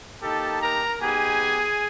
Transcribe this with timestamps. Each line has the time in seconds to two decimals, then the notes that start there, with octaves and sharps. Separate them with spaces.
0.22 A#3 D#4 G4 A4 A5
0.60 A#4 A#5
0.99 B3 D#4 G4 G#4 G#5